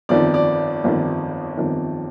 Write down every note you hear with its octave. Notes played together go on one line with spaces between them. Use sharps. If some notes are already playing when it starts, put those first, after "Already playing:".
G1 F2 D#3 D5
D5
G1 F2 D#3
G1 F2 D#3